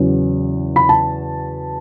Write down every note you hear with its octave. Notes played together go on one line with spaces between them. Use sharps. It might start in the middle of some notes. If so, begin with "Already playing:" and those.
Already playing: E2 C#3 F#3
B5
A5